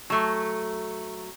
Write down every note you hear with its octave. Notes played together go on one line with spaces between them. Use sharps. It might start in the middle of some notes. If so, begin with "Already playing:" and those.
F#3 A3